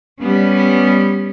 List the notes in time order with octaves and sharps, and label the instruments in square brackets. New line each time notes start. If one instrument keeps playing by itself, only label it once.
[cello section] G3 B3 C#4